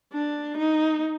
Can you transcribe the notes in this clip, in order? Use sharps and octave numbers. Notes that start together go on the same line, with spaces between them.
D4
D#4